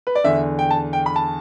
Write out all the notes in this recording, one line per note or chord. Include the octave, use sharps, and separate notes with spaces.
B4
D5
E2 D3 E5
G5
A5
G5
B5
A5